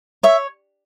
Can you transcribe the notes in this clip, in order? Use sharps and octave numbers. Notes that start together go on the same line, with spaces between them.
C#5 E5